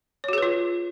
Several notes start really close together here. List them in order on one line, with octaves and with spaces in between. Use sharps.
C#5 F#4 G#4 B4 F4